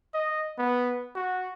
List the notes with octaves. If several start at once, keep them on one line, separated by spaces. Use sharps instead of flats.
D#5
B3
F#4